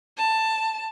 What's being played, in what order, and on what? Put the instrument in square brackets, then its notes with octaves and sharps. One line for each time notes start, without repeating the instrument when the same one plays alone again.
[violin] A5